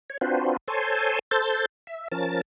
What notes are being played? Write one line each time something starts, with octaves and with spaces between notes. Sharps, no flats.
C#5
C4 D4 F4 F#4 B4 C5
A4 C5 C#5 G#5 A5 C6
A4 C5 G6 A6
E5
F3 C#4 A#4 A5 A6